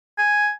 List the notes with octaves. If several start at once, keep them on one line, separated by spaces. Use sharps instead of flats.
G#5